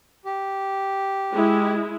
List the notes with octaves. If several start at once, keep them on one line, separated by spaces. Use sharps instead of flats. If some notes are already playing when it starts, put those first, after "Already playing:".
G4
G#3 E4